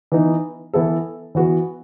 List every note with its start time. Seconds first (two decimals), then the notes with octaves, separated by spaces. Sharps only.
0.12 E3 B3 D#4
0.73 E3 B3 E4 A4
1.35 E3 B3 F#4